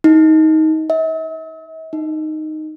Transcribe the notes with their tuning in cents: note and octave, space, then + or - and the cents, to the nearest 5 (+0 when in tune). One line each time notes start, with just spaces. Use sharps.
D#4 +20
E5 -45
D#4 -5